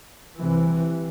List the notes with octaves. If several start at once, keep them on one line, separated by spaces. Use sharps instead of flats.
C2 C3 E3